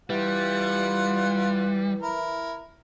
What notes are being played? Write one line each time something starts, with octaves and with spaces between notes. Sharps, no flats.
E3 G3 F4 F#5
E4 A#4